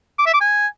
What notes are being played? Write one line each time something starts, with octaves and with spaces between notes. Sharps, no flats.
D6
E5
D6
G#5